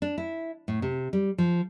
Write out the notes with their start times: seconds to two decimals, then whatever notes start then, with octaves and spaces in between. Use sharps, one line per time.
0.02 D4
0.18 E4
0.68 A2
0.82 C3
1.13 G3
1.38 F3